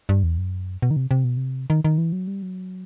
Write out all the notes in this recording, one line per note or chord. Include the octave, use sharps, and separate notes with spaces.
G2
E2
F#2
B2
D#3
C3
C3
B2
C3
D#3
D#3
E3
F#3
G3
F#3